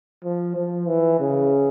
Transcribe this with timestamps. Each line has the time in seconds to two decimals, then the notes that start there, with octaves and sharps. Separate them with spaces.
0.24 F3
0.56 F3
0.88 E3
1.20 C#3